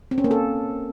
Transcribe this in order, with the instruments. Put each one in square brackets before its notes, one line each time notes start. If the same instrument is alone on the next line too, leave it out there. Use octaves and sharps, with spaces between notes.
[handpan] C4
C#4
A#3
A4